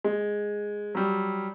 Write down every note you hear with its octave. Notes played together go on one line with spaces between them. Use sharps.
G#3
F#3 G3